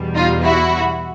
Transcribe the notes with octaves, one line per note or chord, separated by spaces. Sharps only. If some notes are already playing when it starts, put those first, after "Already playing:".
Already playing: E2 B2 G3
D#4 F4
E4 F#4